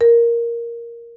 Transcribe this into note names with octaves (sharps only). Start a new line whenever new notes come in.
A#4